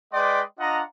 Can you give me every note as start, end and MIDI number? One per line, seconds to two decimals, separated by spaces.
0.13 0.41 56
0.13 0.41 71
0.13 0.41 74
0.13 0.41 75
0.13 0.41 79
0.13 0.41 84
0.59 0.81 62
0.59 0.81 65
0.59 0.81 75
0.59 0.81 78
0.59 0.81 82